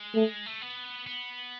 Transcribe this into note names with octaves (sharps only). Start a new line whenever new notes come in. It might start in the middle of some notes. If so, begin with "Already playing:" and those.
Already playing: G#3
A3
A3
B3
B3